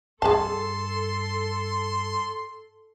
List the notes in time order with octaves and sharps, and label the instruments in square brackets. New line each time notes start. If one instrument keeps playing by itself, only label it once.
[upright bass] G2 [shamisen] G#4 A5 [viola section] A4 [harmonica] C6